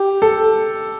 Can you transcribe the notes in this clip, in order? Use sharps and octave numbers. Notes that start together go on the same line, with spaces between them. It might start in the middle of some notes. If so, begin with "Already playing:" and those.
Already playing: G4
A4